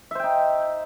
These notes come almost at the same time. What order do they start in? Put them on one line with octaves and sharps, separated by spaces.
E5 C5 G5 D#4